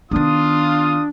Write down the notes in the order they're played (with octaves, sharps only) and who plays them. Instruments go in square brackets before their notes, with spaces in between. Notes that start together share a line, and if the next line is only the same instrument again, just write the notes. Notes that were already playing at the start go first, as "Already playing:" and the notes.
[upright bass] D#3 B3 [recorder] D4 [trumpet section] F4 D#6